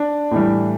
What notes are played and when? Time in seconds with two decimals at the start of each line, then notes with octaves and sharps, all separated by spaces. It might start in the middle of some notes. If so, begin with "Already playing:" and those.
Already playing: D4
0.31 A2 E3 G3